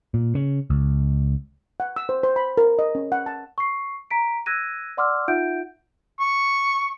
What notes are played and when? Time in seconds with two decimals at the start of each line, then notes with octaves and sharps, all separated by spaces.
0.14 A#2
0.35 C#3
0.70 C#2
1.80 F#5
1.96 E6
2.09 C5
2.23 C5
2.36 B5
2.57 A#4
2.79 D#5
2.95 C#4
3.12 F#5
3.26 A5
3.58 C#6 C7
4.10 A#5 B6 D7
4.46 E6 F#6 G#6 A#6 D#7
4.97 D5 F#5 C6 D6 E6 F6
5.28 D#4 F4 E5 F#5 G6 D7
6.20 C#6